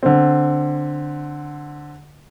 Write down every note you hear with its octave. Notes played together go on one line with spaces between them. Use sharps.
D3 C4